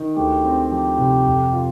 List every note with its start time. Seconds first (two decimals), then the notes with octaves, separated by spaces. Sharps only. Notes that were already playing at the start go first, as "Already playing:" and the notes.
Already playing: D#3
0.16 D2 G4
0.45 C4
0.71 F3 G4
0.98 C3
1.26 F2
1.53 F4